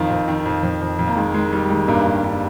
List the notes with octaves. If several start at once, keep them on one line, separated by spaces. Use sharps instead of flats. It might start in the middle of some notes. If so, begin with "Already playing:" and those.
Already playing: F2 D#3 F4
F2
D#3
F2
F2
F2
F2
A#3
D#3 G#3
D#3 G#3
D#3 G3
D#3 G#3
G2 A#3
G2
G2